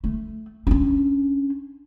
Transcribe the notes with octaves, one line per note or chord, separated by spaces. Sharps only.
A3
C#4 D4